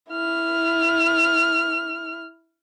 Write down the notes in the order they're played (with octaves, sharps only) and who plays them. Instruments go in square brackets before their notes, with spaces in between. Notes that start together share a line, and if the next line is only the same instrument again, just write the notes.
[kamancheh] E4 F6